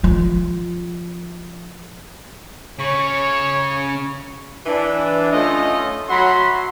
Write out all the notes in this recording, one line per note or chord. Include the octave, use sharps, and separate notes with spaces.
F3 F4
C#3 C#5 C#6
E3 D4
A3 C#4 D#4 F4 A4 D#5
F#3 F#4 E5 F#5 B5 C6